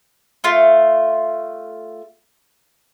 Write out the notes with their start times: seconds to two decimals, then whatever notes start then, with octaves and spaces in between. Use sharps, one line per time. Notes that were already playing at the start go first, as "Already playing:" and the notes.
0.44 A3 F4